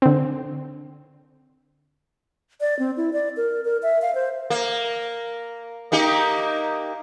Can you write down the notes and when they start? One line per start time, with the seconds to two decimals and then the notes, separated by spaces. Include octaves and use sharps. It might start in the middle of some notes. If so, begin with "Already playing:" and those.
0.02 D3 C4
2.61 D5
2.79 C4
2.97 E4
3.13 D5
3.37 A#4
3.65 A#4
3.83 E5
4.02 F5
4.15 C5
4.50 A#3
5.92 A#3 D#4 G4